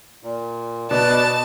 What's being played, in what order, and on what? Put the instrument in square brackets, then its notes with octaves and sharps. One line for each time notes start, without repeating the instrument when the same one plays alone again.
[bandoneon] A#2
[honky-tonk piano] B2 [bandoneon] B4 D5 [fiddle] A5